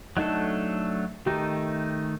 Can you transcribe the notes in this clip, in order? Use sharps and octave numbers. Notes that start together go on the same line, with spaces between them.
F#3 A3 D4 D#4 A4
D#3 A3 D#4 G4